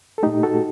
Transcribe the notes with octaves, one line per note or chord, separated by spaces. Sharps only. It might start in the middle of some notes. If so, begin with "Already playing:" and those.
A4
A#2 A3 D#4 G4
F#4 A4